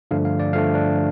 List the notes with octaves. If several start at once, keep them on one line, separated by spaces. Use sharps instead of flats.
G2 D3 F3 A3 D4 F5
F5
D5
G2 D3 F3 A3 D4 F5
D4